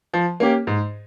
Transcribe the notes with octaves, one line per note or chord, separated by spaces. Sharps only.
F3
A#3 C#4 G4
G#2